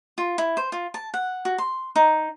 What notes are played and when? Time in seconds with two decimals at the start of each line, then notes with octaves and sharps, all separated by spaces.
0.18 F4
0.38 E4
0.57 C5
0.72 F4
0.94 A5
1.14 F#5
1.45 F#4
1.58 C6
1.96 D#4